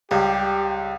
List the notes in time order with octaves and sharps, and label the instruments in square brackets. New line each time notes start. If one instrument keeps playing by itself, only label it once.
[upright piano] C#2 [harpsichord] G3 [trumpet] G4